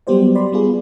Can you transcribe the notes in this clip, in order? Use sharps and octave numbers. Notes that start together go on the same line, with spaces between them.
F#3 G3 B3 G4 C5 D5
D5 B5 C6
G3 B3 F4 G#4